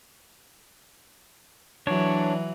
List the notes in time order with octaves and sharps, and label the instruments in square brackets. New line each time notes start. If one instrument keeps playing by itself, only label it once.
[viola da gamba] E3 F#3 [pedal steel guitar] D4 C#5